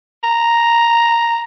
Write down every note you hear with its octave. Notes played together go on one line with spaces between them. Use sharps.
A#5